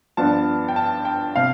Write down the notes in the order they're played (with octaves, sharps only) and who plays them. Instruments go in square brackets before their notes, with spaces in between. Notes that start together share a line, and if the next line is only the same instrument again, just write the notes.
[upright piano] G2 F3 B3 D4 A5
G5
A5
G5
C3 F5